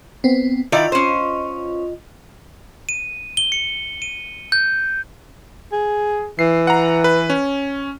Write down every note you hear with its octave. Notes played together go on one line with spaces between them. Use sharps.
B3 C4
D#3 E4 F4 D5 D#5
C#4 C5
D#7
G7
C#7
D#7
G6
G#4
E3 C7
F#5 A#5
B4
C#4